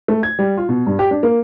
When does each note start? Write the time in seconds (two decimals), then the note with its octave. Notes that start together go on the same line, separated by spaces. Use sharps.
0.08 A3
0.23 G#6
0.39 G3
0.57 F4
0.69 B2
0.87 G2
0.99 G4
1.11 D4
1.23 A#3